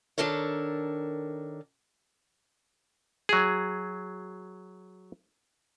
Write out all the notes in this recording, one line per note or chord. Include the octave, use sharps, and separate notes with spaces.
D#3 D4 A4 A#4 C#5
F#3 G#4